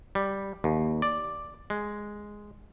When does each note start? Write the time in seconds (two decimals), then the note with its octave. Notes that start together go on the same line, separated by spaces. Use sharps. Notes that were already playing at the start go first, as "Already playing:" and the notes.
0.15 G3
0.64 D#2
1.02 D5
1.70 G#3